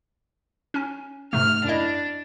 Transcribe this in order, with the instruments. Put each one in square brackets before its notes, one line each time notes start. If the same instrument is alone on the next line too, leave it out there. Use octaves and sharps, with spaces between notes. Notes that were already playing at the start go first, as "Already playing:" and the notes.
[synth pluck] C#4 G#5
[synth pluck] G#2 C3 A3 [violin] F6
[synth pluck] F#2 E4 D#5 [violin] D4